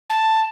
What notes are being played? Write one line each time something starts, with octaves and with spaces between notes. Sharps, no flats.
A5